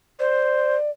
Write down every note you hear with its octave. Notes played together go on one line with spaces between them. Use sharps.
C5 D5